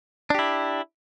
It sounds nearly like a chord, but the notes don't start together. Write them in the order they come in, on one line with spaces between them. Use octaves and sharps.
D4 G4 E4